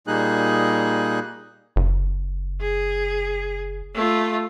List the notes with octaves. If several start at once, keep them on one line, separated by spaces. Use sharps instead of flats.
A#2 G3 A#3 D#4 G#4 F#6
F#1
G#4
A3 F4